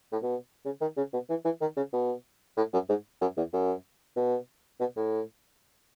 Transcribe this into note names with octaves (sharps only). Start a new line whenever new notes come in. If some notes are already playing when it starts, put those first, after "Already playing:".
A2
B2
C#3
D#3
C#3
B2
E3
E3
D#3
C#3
B2
A2
F#2
G#2
F#2
E2
F#2
B2
B2
A2